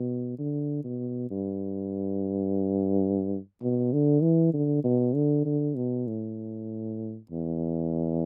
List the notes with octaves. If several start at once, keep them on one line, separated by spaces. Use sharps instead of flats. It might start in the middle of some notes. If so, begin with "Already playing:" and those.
Already playing: B2
D3
B2
G2
B2
D3
E3
D3
B2
D3
D3
B2
A2
E2